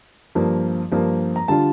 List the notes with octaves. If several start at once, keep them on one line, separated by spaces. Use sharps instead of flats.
G2 F3 A#3
G2 F3 A#3
A#5
D3 G3 D4 F4 A5